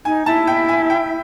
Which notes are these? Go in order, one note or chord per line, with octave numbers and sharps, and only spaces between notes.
D#4 G#5
E4 A5
G5
G#5
G5